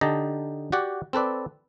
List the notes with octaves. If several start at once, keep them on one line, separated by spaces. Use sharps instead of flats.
D3 D#4 G4 D#5 A5 A#5
F#4 G4 D5 F#5
C4 A4 B4 D5